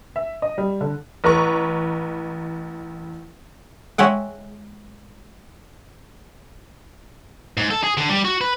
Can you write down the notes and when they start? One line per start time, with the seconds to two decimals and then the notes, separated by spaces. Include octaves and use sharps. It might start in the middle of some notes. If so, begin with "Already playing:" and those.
0.16 E5
0.42 D#5
0.58 G3
0.81 D3
1.24 A1 B4 A#5 C#6
3.98 G#3 C#5 E5 F#5 G5
7.57 G#2
7.70 A4
7.84 G#4
7.97 D3
8.09 G3
8.25 F#4
8.41 B4